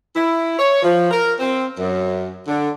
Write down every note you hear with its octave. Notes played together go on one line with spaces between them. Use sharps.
E4
C#5
F3
A#4
C4
F#2
D3